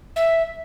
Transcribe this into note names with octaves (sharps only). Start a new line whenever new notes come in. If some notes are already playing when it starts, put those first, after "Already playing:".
E5